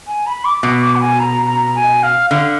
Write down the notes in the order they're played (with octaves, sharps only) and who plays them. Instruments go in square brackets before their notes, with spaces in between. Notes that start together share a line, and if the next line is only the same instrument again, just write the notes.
[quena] G#5
B5
D6
[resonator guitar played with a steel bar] B2
[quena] D6
F#5
G#5
A#5
A#5
G#5
F5
[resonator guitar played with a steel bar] D3 [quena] F5